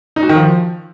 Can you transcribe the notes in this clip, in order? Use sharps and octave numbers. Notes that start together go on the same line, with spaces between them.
D#4
F#4
D#3
F3